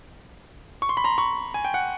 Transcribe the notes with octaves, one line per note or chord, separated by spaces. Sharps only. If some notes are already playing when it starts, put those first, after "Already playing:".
C#6
C6
B5
A#5 C6
B5 C#6
G#5
G5
F#5